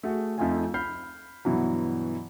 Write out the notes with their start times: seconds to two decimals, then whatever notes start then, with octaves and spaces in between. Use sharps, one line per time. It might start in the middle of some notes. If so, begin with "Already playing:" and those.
0.03 A3 F#4 G#4
0.38 F2 A3 D#4 F4 F5 G#5
0.74 B5 F6 G6 C7
1.45 G2 B2 E3 F#3